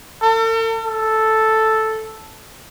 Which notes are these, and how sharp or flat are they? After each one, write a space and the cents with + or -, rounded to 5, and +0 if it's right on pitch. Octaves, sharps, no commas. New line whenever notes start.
A4 +45
A4 -5